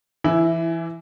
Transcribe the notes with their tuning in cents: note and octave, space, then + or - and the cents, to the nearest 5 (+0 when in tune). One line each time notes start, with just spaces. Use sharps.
E3 +20 E4 +0